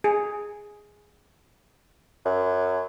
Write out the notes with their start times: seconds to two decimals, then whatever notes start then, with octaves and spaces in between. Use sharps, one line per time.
0.04 G#4
2.25 F#2